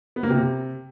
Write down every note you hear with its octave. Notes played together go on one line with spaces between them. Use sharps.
B3
A#3
C3